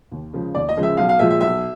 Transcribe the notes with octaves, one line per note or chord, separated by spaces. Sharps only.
D#2
C#3 F3 G#3
D#2 D5
D#5
C#3 F3 G#3
E5
B1 F5
F5
A#2 F3 G#3 E5
E5
B1 E5